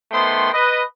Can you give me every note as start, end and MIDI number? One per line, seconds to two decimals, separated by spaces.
0.12 0.48 51
0.12 0.48 57
0.12 0.48 59
0.12 0.48 72
0.12 0.48 79
0.12 0.48 84
0.53 0.81 71
0.53 0.81 75